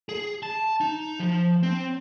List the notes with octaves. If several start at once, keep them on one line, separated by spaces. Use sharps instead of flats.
G#4
A5
D#4
F3
C4